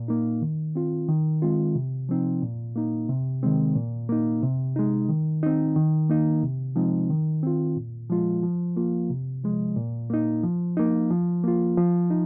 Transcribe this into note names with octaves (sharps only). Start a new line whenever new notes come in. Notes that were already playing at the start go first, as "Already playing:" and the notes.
Already playing: A#2
A#3 D#4
D#3
C4 F4
D#3
G#3 C4 F4
C3
F3 C4 D#4
A#2
A#3 D#4
C3
D#3 G#3 C4
A#2
A#3 D#4
C3
G#3 D#4
D#3
C4 D#4
D#3
A#3 D#4
C3
F3 G#3 C4 D#4
D#3
C4 F4
A#2
F3 G#3 F4
F3
A#3 F4
C3
F3 G#3
A#2
A#3 D#4
F3
A#3 D#4
F3
A#3 F4
F3
D#4